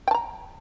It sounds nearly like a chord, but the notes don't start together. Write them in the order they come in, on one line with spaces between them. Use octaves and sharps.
G5 A5 A#5